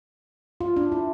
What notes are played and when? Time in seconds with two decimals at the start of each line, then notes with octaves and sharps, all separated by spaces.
0.61 F4
0.76 D4
0.92 E4